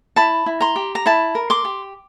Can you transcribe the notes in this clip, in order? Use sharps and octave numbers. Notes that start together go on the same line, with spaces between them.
E4 A5 B5
E4
A#5 C6
G4
A#5
E4 A5 B5
A#4
C6 D6
G4